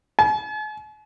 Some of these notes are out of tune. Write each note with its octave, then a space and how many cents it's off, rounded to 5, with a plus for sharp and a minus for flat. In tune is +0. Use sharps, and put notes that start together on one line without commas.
G#5 +45